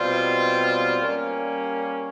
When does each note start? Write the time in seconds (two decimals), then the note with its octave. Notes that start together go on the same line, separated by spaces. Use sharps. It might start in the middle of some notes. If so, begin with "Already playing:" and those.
Already playing: B2 G3 C4 F4
0.99 G3 A#3 C#4